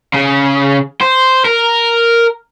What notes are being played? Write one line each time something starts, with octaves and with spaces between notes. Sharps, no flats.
C#3
C5
A#4